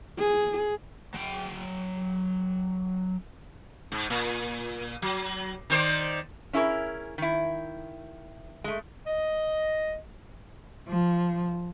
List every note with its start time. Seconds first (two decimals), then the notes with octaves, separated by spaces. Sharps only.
0.18 G#4
1.14 F#3 G5
3.92 G#2
4.10 A#2
5.02 F#3
5.70 D#3 C5 D5
6.53 C#4 E4 G#4 A#4
7.18 D#3 E4
8.64 G#3 A3
9.07 D#5
10.88 F3